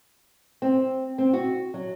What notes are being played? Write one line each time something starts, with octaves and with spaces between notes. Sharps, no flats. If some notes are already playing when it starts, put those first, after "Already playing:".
C4
C4
F#4
F#3